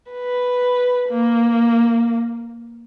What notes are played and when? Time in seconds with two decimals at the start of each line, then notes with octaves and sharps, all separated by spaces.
0.11 B4
1.09 A#3